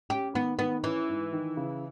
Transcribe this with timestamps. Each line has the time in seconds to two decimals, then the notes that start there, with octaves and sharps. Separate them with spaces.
0.10 C#4 G4
0.34 D#3 B3
0.59 D#3 B3
0.84 E3 C#4
1.08 G#2
1.33 D#3
1.57 C#3